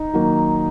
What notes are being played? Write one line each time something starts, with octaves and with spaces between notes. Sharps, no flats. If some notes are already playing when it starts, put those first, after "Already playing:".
Already playing: D#4
D#3 F#3 A#3